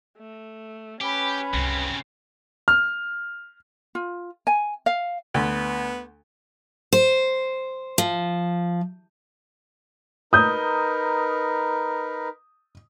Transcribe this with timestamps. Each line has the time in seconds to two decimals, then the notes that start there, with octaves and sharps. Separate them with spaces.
0.19 A3
1.01 C#4 G4 B4
1.53 F#1 C2 C#3 C4
2.68 F6
3.95 F4
4.47 G#5
4.86 F5
5.34 D2 B3
6.93 C5
7.98 F3
10.33 D#4 A#4 B4 D#6 G6